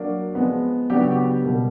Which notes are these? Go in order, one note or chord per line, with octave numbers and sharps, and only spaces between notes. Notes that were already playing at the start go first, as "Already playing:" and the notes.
Already playing: F#3 A#3 D4
F3 G#3 B3
C#3 F#3 B3 D4 G4
F#4
G4
B2 G3 A#3